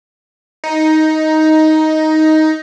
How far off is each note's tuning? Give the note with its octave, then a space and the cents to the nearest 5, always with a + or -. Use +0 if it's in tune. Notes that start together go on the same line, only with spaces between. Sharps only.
D#4 +10